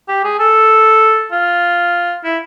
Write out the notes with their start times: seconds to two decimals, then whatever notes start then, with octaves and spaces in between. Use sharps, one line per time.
0.09 G4
0.24 G#4
0.39 A4
1.32 F4
2.24 E4